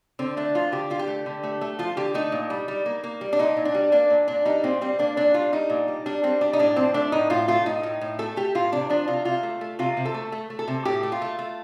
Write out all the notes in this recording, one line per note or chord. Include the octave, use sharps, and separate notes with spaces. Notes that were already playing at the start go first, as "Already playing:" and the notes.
D3 C4
A3 D4
F3 F4
D3 G4
D3 F4
G4
A3
D3
A3
A3
F3 F4
D3 G4
A3 D#4
A#2
G3
G3
A#3
A#3
G3
D4
A#2 D#4
A#2
D4
G3
A#3 D4
A#2
A#2 D4
G3 D#4
A#2 C4
G3 C4
A#3 D4
A#2 D4
G3 F4
G3 D#4
A#2
G3
G3 D4
G3 C4
G3 D4
D#4
A2 D4
F3 C4
A3 D4
A2 D#4
A2 F4
A3 F4
A2 D#4
A2
A2
A3 A4
A3 G4
A2 F4
C3 D4
F3 D4
C3 F4
C3 F4
A3
A3
C3 F4
C3
A4
A3
A3
A3
A4
C3
A2 G4
A3
F4
A3
A3